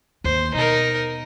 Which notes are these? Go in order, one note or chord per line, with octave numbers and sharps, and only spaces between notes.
D#2 C5
B2 D#4 A#4